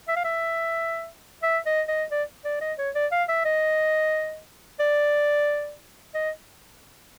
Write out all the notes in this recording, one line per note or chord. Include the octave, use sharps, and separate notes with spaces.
E5
F5
E5
E5
D#5
D#5
D5
D5
D#5
C#5
D5
F5
E5
D#5
D5
D#5